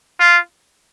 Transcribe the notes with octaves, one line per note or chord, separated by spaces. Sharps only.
F4